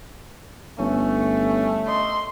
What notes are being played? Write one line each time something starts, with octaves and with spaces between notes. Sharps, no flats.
G1 A3 C#4
D#5 C6